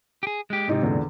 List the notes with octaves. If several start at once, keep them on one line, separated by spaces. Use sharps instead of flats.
G4 G#4
G#3 G4
G#2 C3 C4 D#4 G4
E2 A#2 D3